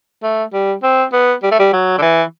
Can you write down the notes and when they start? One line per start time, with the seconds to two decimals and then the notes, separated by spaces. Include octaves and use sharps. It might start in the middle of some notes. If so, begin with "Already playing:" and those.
0.23 A3
0.53 G3
0.83 C4
1.13 B3
1.43 G3
1.52 A3
1.59 G3
1.73 F#3
1.98 D3
2.02 E3